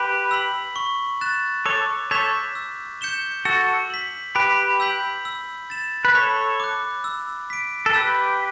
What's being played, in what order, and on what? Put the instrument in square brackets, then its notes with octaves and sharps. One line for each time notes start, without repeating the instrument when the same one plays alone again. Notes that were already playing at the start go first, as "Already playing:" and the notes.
Already playing: [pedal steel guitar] G4 B4 [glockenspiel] B5
[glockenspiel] E6 B6 F#7
C#6
F#6 A6 E7
[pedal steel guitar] A4 C#5 [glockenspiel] D6
[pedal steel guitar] A4 C#5 [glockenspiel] G6 B6 E7
[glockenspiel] E6
G6 C#7 E7 G7
[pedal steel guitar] F#4 A4 [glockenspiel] E6
[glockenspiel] B6 F#7
[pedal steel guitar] G4 B4 [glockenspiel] B5
[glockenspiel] E6 G6 B6 F#7
E6
A6 E7
[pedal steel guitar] B4
[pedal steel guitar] A4 C#5 [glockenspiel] B5
[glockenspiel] D6 F#6
E6
B6 D7
[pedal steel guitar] A4
[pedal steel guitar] G4 B4 [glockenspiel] E6